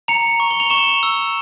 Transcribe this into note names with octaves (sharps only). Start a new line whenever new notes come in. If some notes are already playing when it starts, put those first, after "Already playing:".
A#5 C#7 F7
C#6
G7
F7
C#6 E7 G7
E6